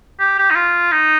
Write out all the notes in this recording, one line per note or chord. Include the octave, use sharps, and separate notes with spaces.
G4
G4
D#4
F4
D#4